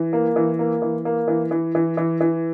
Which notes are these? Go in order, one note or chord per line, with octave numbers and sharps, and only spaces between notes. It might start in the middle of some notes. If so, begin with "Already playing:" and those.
Already playing: E3
A#3
E3
A#3
E3
A#3
E3
E3
E3
E3
E3